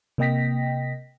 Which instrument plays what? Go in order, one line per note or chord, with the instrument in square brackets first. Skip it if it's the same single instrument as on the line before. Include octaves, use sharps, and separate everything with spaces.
[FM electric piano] C3 A#3 D#5 G5 A#6 B6